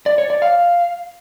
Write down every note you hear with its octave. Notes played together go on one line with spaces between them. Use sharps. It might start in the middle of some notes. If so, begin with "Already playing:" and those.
D5
C#5
D5
F5